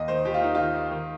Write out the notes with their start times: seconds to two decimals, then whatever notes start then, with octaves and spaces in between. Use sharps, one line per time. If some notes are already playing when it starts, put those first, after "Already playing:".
Already playing: D#2 D#5
0.08 D#3 C5
0.25 D#2 G4
0.34 F4
0.41 D#3 D#4
0.55 D#3 F4
0.74 D#3
0.91 D#3